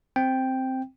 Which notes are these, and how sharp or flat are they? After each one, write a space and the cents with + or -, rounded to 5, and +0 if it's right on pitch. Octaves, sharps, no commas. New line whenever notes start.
C4 +0 G5 +0